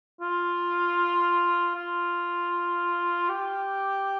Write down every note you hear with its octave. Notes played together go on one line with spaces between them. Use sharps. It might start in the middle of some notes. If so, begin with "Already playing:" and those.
F4
F4
G4